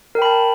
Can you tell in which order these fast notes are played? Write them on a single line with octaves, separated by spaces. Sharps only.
A#4 G5 B5 A5